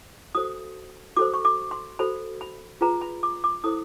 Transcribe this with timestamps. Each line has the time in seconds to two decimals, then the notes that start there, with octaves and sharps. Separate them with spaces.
0.35 F#4 A4 C5 D#6
1.16 F#4 A4 C5 D6
1.34 C#6
1.45 D6
1.71 C6
1.99 F#4 A4 C5 B5
2.41 B5
2.81 F4 G#4 B4 A#5
3.01 B5
3.23 D6
3.44 D6
3.64 E4 A4 C5 D#6